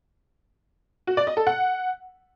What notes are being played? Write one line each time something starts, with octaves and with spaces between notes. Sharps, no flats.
F#4
D5
D#5
A4
F#5